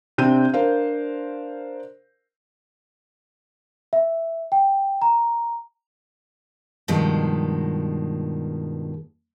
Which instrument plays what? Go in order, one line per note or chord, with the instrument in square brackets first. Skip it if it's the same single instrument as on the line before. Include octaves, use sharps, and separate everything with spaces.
[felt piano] C3 C4 D4 G4 G6 D#7
D4 A#4 C5 F5
[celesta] E5
G5
A#5
[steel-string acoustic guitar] G2 B2 D#3 F3 G#3